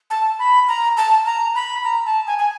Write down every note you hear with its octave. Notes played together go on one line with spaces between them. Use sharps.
A5
B5
A#5
A5
A#5
B5
A#5
A5
G#5
G#5